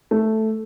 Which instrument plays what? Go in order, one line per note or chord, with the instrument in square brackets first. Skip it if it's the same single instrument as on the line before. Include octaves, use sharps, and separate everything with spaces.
[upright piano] A3